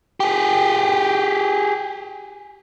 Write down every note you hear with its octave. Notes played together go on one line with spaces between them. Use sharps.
G4 G#4